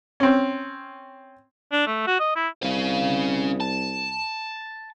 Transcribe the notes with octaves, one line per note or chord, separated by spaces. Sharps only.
C4 C#4
D4
A3
F#4
D#5
E4
C2 C#4 F5
A5